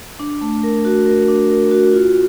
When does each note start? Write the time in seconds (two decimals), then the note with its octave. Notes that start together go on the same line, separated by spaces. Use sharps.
0.20 D4
0.41 A3
0.63 A#4
0.85 F#4
1.06 A#4
1.28 D4
1.50 A#4
1.71 F#4
1.93 F4